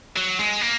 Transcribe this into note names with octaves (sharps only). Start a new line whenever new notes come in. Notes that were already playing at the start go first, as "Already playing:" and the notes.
F#3
G#3
A#3